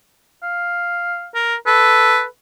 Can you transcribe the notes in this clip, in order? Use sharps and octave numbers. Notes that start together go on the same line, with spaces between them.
F5
A#4
A4 B4